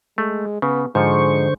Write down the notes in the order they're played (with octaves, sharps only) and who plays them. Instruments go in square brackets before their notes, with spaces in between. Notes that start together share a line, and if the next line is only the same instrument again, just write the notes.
[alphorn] G#3 [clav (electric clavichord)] A3
[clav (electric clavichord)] C#3 [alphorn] B3
[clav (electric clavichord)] G#2 F3 [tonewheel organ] D3 C5 C#6 [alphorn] G#3